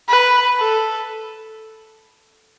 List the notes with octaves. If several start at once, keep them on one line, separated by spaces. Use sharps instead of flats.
B4
A4